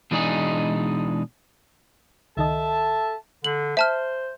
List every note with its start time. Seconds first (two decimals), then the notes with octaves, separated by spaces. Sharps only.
0.11 B2 E3 G#3 D4 D#4 G#4
2.37 C#2 D#3 A4 D#5 E5 A5
3.44 D3 F#7
3.77 C5 E5 A5 F6